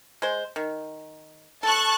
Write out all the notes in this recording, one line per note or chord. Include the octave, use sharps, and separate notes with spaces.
G#3 C5
D#3
A4 A5 C#6 F#6